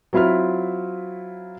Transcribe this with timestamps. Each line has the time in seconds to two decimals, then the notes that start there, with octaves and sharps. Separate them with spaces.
0.13 F#3 C4 E4 F4 B5 F6